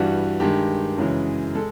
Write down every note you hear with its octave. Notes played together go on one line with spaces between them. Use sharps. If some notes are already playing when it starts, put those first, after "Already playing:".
Already playing: G2 E3 G3 F#4
G2 D#3 G#3 G4
F#2 C#3 E3 G#3
G#3 A4